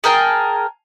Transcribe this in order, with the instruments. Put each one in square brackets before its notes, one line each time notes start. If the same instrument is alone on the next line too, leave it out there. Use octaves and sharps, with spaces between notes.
[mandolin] G#4 A#4 G5 A5